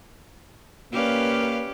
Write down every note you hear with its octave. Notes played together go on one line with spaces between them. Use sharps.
A#3 C#4 G4 B4 D5 F5